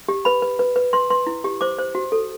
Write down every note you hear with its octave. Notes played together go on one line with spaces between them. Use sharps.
G4
B4 B5
B4
B4
B4
B4 C6
B4 C6
E4
G4
C5 D6
C5
F#4
A4